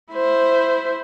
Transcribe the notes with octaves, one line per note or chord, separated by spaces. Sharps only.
E4 C5